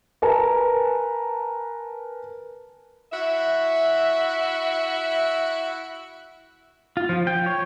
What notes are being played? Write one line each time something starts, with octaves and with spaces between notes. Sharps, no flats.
A#4 B4 G#5 A5
E4 F#4 E5
F4
F3
G5
C#5